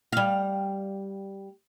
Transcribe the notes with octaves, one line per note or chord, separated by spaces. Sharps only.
G3 F5